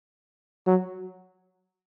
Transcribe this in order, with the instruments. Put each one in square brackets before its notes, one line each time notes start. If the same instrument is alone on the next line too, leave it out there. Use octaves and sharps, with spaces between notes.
[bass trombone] F#3